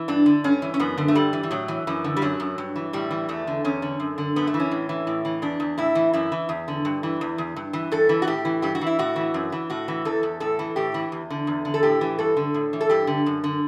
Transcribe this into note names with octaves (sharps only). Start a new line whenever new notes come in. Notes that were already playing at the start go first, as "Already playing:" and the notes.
Already playing: E3
G2 D4
D3
G2 C#4
E3
C#4
F#2 B3
D3
A3
G2 G3
E3
E3
A2 F#3
E3
F#2 E3
D3
G3
F#2 F#3
F#2
G2
E3
A2 G3
E3
E2 A3
D3
E2 C#4
D3
F#2
D3
F#2 B3
A3
E3
C#4
A2
E3
A2
E3
E2 D4
E2
A2 E4
E3
F#2 E4
E3
E2
D3
G2
E3
E2
E2
G2
E3
G2 A4
E3
F#4
A2 G4
E3
G2 G4
F#4
E3
E4
A2 F#4
E3
F#2
E3
A2 F#4
E3
E2 A4
E2
A2 A4
E3
A2 G4
E3
E2
D3
E2
D3
A4
A2 G4
E3
G2 A4
D3
A2
E3
A4
G2 G4
D3
F#2
D3